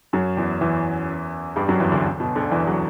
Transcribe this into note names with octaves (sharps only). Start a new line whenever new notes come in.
F#2 F#3
E2 E3
E2 E3
G2 G3
F#2 F#3
E2 E3
D2 D3
B2
D2 D3
E2 E3
F#3